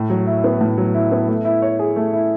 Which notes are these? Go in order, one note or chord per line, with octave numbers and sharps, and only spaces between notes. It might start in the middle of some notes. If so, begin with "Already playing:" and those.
Already playing: A2
F#3
E4
B3
A2
F#3
E4
B3
A3
E4
C#5
G#4
A3
E4